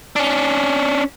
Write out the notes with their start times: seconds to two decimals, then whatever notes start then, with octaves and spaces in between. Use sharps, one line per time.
0.16 C#4 D4